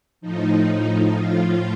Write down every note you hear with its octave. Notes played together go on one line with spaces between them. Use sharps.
A2 F3 D#4
A2 F3 F4